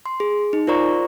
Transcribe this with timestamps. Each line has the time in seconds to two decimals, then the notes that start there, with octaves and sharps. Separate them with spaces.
0.06 C6
0.20 G#4
0.53 D#4
0.67 F4 A#4 C5 D5 A#5 C#6